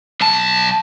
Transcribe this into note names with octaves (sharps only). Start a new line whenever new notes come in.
B1 A5